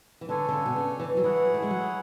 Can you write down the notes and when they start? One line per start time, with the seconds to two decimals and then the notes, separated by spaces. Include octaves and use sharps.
0.21 E3
0.29 D3 D4 A4 C#5 G#5
0.49 D3
0.53 C#3
0.66 B2
0.76 C#3
1.00 E3
1.17 F#3
1.24 E3 E4 G#4 C#5 F#5
1.54 A3
1.62 G#3
1.71 F#3